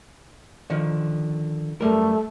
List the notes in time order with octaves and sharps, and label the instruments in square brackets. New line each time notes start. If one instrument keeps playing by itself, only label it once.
[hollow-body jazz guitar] D3 D#3 F3
[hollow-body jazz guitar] F#2 G3 A#4 [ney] A3